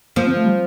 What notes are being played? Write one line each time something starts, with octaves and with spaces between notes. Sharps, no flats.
F3 A#3
C4
A3
G3